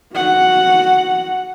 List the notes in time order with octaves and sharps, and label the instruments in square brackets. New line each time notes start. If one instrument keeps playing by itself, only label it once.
[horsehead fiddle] F#4 F#5